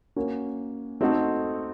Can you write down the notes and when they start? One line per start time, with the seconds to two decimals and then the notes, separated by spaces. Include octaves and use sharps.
0.16 A#3 C#4 F#4
1.01 A3 C4 D#4 F#4 A4